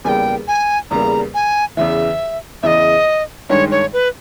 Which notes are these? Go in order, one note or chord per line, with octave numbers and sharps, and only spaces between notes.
E2 C#3 G3 A#3 G5 G#5
G#5
E2 C#3 G3 A#3 A#5
G#5
E2 C#3 E3 E5
E2 C#3 E3 D#5 E5
G2 D#3 G#3 C#5
C#5
B4